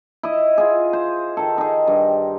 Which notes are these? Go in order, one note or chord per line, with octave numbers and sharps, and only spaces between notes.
E4 D#5
F4 G#4
C5
D#3 A4
D#4 G#4
G2